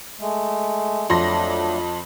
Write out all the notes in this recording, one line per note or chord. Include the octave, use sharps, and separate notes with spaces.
G#3 A3
F2 F#3 A3 D4 C6 A#6